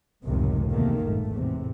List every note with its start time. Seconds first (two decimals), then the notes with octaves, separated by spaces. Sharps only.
0.24 F1 C#2 F#2 A2 C3 D#3
0.70 E2 C3 D#3 A3 A#3
1.00 G#1 G2 A#2 A3
1.32 E2 A2 C3